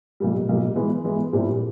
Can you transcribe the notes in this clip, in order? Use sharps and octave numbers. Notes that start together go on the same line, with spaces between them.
B1 A#2 G3
B1 A#2 G3
E3 G#3 B3 E4
E3 G#3 B3 E4
A#1 A#2 G3 C4 E4